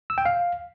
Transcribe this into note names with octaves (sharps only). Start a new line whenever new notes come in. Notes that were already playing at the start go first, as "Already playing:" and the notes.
E6
G5
F5